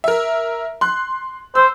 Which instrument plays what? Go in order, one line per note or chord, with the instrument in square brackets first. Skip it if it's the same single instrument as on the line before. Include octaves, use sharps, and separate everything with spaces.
[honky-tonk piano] A#4 E5
C6 F#6
[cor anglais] C5 [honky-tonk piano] E6